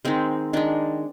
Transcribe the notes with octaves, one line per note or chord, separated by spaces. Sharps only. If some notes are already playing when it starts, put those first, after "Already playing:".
D#3 G#3 C4
D#3 G#3 D4